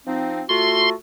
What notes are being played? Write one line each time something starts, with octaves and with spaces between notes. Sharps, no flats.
F3 C4 D#4
A3 F4 F#4 C6